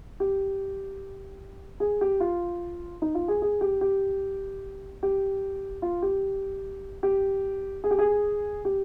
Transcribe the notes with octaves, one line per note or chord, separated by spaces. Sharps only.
G4
G#4
G4
F4
D#4
F4
G#4
G#4
G4
G4
G4
F4
G4
G4
G#4
G4
G#4
G4